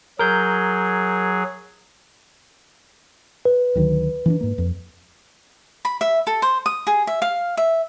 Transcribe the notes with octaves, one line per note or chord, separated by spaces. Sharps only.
F#3 G#4 A#4 G6
B4
D2 D#3 F#3
E3 C#4 D4
G#2 A#3
F2
B5
E5
A4
C5
D#6
G#4
E5
F5
E5